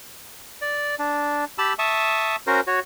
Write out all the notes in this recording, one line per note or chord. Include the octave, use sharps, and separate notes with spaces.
D5
D4
G4 A5 B5 E6
E5 A5 C#6 D#6
C#4 F#4 A#4 C5
F#4 C#5